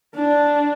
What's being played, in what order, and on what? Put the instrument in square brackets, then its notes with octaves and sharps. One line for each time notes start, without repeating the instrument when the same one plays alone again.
[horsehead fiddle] D4